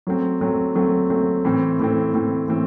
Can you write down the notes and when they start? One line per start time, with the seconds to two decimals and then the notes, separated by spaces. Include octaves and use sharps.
0.07 F#3 A3 C4
0.41 F#3 A3 C4
0.75 F#3 A3 C4
1.10 F#3 A3 C4
1.45 A2 E3 A3 C4
1.79 A2 E3 A3 C4
2.14 A2 E3 A3 C4
2.48 A2 E3 A3 C4